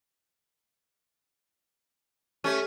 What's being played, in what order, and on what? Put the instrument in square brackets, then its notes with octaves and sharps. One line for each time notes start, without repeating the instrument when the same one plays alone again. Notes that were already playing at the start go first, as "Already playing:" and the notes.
[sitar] A3 C#4 [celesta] G4 F6 D#7